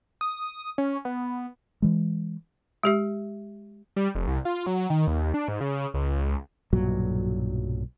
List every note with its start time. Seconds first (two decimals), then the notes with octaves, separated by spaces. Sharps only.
0.21 D#6
0.78 C#4
1.05 B3
1.82 E3 G#3
2.83 G#3 G4 E5
3.96 G3
4.15 F1
4.28 C2
4.45 F4
4.66 F#3
4.90 D#3
5.07 D#2
5.34 D4
5.48 G#2
5.61 C#3
5.94 C#2
6.73 B1 G2 A#2 F#3